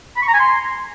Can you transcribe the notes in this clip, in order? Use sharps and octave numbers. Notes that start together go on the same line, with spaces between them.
B5
C#6
A#5
G#5
C6